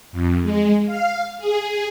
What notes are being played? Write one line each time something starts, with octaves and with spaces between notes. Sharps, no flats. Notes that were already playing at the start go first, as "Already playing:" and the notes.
F2
G#3
F5
G#4